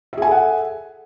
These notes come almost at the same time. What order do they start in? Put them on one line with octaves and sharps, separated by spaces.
E5 G#4 G#5 A4 F#5